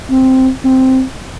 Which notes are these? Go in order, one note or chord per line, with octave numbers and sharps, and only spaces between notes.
C4
C4